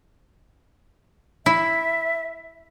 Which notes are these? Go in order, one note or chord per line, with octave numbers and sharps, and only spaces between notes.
E4 E5